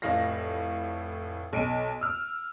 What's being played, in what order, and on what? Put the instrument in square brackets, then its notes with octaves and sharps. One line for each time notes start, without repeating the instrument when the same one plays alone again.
[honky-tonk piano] F1 A2 F5 A#6
B1 D7 D#7
E6 F6